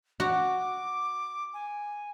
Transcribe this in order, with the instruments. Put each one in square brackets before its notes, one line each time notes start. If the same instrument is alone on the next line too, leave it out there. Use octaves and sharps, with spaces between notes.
[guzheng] F#4 [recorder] D6
[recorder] G#5